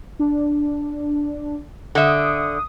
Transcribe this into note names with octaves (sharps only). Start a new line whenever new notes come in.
D4
D3 E5 D#6